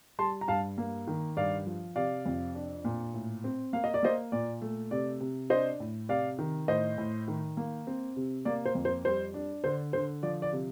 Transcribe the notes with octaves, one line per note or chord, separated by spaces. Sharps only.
G3 A5 C6
A#5
G2 F5 A5
A#3
D#3
G2 D5 F5
F3
C3 D5 F5
F2
D4
A#2
A2
C4
A#3 F5
D#5
D5
A#3 C5 D#5
A#2 D5
A3
C3 D5
C3
D4 C5 D#5
A2
C3 D5 F5
D#3
A2 C5 D#5
A2
D#3
A#3
C4
C3
A#3 D5
C5
F2
C5
G3 C5
D4
D3 C5
D3 C5
F3 D5
D5
C3